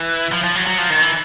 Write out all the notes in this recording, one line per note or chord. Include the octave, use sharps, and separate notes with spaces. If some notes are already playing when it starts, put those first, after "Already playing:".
Already playing: E3
F3
F3
F#3
F#3
F3
D#3
E3